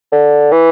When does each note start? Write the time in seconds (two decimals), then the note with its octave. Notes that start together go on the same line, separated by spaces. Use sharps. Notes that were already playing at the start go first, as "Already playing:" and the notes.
0.12 D3
0.52 E3